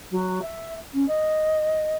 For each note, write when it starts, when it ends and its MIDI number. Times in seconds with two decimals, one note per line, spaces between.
0.11 0.41 54
0.41 0.74 76
0.93 1.04 61
1.07 1.96 75